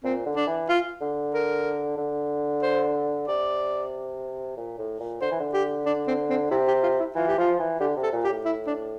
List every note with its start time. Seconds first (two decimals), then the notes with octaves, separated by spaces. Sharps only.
0.04 A#2 C4
0.26 D3
0.36 D4
0.47 E3
0.69 F4
1.01 D3
1.34 A#4
1.98 D3
2.62 C5
3.28 C3 D5
4.57 A#2
4.78 A2
5.00 A#2
5.21 D3 C5
5.31 E3
5.40 D3
5.53 G4
5.86 D4
6.07 C4
6.30 C4
6.51 C3 E4
6.68 G4
6.83 F4
7.00 E4
7.16 E3 F4
7.27 G4
7.38 F3 F4
7.60 E3
7.80 D3 G4
7.97 C3
8.03 A4
8.13 A#2
8.24 G4
8.30 A2
8.45 E4
8.67 D4